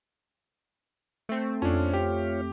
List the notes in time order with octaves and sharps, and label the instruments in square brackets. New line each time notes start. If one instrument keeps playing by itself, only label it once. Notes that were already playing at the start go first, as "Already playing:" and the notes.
[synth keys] A3 C4
[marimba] F2 [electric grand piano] C#4 D4 [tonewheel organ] F4 C#5 F6
[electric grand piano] G4